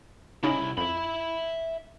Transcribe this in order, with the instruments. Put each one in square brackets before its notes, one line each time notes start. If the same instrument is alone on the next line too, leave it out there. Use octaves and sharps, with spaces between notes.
[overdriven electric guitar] C2 E4 [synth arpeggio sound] C#3 C#4 D#4
[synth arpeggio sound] F2 [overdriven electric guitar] E5 B5